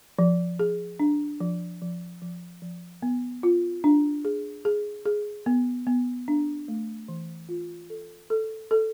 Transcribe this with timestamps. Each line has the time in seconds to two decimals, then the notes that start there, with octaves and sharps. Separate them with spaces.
0.19 F3
0.59 G#4
1.00 D4
1.41 F3
1.82 F3
2.22 F3
2.62 F3
3.02 B3
3.43 F4
3.84 D4
4.25 G#4
4.65 G#4
5.06 G#4
5.46 B3
5.87 B3
6.28 D4
6.68 A3
7.08 E3
7.49 F4
7.90 A4
8.30 A4
8.71 A4